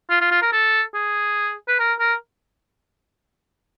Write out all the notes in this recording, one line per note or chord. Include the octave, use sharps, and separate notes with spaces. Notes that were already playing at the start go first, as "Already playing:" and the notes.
F4
F4
F4
A#4
A4
G#4
B4
A#4
A#4